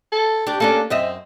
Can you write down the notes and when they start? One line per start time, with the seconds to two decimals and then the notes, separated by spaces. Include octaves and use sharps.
0.12 A4
0.47 D4 G4
0.60 A#3 C#4 D4 A4
0.90 F#2 C4 D#5 E5